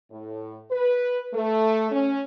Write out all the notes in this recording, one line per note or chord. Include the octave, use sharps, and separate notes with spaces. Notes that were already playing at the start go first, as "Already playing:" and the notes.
A2
B4
A3
C#4